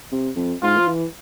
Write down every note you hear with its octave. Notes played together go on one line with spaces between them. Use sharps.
C3
F2
G#2 F4
F3
E3